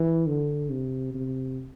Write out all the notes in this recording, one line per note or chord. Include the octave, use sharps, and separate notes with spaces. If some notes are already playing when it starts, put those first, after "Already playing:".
Already playing: E3
D3
C3
C3